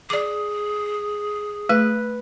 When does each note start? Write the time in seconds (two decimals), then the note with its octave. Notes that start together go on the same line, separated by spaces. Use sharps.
0.10 G#4 D5 D6
1.69 A3 B4